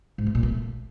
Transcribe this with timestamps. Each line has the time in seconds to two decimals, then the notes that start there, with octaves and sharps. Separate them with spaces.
0.18 G#2
0.27 A3
0.35 A#2
0.43 A3